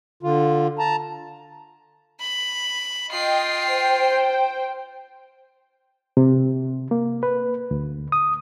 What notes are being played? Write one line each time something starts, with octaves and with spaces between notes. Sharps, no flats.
D3 F4
A5 A#5
B5
F4 D#5 G5 C7
C5 G5
C3
A#3
B4
D2
D#6